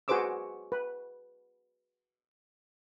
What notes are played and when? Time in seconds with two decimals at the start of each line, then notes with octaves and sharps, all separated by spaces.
0.08 F#4 G#4 B4 C5 D6 E6
0.72 B4